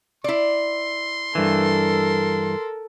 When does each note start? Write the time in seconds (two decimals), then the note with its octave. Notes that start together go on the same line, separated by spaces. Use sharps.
0.24 E4 D5 C6
1.35 G2 E3 A4 A#4